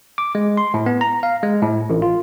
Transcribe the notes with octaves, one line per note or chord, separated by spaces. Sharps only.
D6
G#3
C6
A2
B3
A#5
F5
G#3
A2
A1
F4